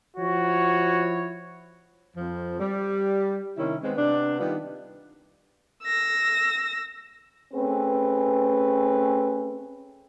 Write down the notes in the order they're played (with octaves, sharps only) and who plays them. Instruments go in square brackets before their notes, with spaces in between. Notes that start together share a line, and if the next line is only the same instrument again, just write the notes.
[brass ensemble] F3 E4 C#5 [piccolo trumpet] F#4
[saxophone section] F2 F3
G3
C3 D#3 C#4 E4
D#3 G#3 B3 C4
C3 B3 D4
D#3 G3 B3 F4 G4
[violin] E6 A#6
[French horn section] A3 C4 C#4 G#4 B4